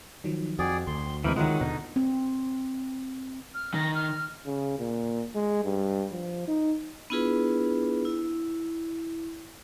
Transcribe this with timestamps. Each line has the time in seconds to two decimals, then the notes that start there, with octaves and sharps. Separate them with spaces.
0.24 D#3 F3 F#3
0.59 F2 F#4 G#4 D5 G5
0.87 D2 C6
1.24 D#2 C3 E3 G#3 C4 A#4 G5 B5
1.36 D#3 F#3 G#3 F4 A#4 E5 F#5
1.61 D#2 B2 D3 D#4
1.96 C4
3.54 F6
3.74 D#3 A#6
3.95 F6
4.46 C#3
4.79 A#2
5.35 G#3
5.64 G2
6.11 F3
6.48 D#4
7.10 B3 D4 E4 F4 G#4 B4
8.05 E4